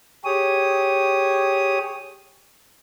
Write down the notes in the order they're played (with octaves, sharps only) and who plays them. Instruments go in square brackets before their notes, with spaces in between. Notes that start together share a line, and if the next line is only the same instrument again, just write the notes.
[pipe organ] G4 G#4 C#5 D#6